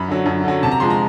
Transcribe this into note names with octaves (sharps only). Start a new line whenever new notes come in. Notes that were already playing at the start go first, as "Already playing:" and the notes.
Already playing: F#2 B5
D3 F#3
F#2
D3 F#3
C3 A5
A#5
F3 G#3 C6
A#5